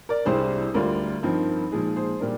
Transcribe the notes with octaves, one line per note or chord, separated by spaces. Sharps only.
A#4 D5
C2 C3 G3 D4 G#4 C5
D2 D3 G3 D4 F4 A#4
G2 F3 C4 D#4
A#2 F3 G#3 D#4 G#4
G#4 C5
A#2 G3 D4 A#4